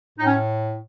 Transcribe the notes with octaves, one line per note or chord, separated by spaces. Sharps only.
A2 D#4
C#4